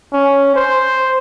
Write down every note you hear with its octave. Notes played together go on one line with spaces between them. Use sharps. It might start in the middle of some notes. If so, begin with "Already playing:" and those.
C#4
C5